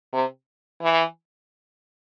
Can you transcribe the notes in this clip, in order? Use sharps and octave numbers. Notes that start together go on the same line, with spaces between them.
C3
E3